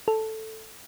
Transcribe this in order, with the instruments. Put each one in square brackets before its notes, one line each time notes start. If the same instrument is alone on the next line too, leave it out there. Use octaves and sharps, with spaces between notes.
[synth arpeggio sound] A4